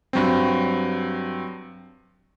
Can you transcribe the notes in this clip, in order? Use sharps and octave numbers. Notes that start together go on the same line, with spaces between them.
G2 F#3 C4